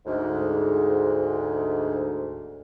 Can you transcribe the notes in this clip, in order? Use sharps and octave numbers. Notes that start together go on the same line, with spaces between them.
D2 G#2